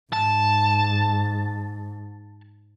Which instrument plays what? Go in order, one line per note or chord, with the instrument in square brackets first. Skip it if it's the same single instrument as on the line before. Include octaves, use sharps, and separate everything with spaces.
[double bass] G#2 [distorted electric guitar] A5